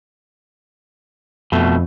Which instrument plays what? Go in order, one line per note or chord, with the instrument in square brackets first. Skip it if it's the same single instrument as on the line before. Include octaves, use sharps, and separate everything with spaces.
[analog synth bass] F2 [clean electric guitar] B2 A3